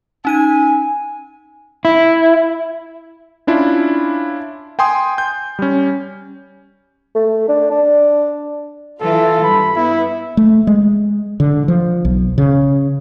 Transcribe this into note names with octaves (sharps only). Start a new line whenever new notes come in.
C#4 D#4 G#5 D#7
E4
C#4 D4 E4 F4
G5 G#5 C6 D#6
G6
G3 C#4
A3
D4
D4
E3 F4 A4
G2 B5
B3 E4
A3
G#3
D3
F3
B1
C#3